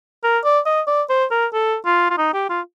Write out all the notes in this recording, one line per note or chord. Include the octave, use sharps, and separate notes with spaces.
A#4
D5
D#5
D5
C5
A#4
A4
F4
F4
D#4
G4
F4